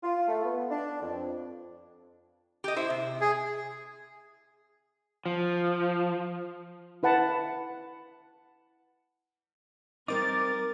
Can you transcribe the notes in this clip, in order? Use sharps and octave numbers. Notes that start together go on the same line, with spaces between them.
F4
A3
B3
D4
F2
G4 D#5
E4 C5
C3
G#4
F3
E4 B4 F#5 A5
G3 C4 D#4 A#4 D6 A6